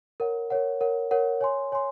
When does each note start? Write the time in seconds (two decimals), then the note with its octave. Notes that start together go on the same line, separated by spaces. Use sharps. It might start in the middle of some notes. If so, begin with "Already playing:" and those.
0.20 A#4 C#5 F#5
0.50 A#4 C#5 F#5
0.81 A#4 C#5 F#5
1.11 A#4 C#5 F#5
1.41 C#5 G#5 C6
1.72 C#5 G#5 C6